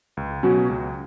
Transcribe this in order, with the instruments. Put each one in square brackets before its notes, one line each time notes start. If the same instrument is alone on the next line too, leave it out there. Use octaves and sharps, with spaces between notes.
[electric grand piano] C#2
B2 F#3 C#4 F#4
C#2